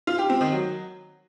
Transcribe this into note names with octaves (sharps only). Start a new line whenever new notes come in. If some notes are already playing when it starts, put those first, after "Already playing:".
F4
G4
C4
D#3
F#3